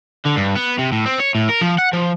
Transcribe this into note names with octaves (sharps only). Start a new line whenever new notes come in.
D3
G2
B3
C3
A2
C4
C#5
A2
A#4
F3
F#5
F3